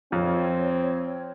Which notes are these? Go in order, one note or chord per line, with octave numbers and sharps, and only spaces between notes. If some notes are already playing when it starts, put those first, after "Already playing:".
F2 C4 C#5